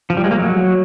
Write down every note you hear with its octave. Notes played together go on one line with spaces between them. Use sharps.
F3
G3
G#3
A#3
F#3